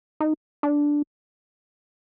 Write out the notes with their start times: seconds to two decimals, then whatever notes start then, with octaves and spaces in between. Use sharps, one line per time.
0.20 D#4
0.63 D4